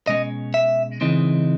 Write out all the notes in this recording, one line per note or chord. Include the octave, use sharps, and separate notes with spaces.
B2 G#3 C#4 D#5
E5
C#3 E3 G#3 C4 D#4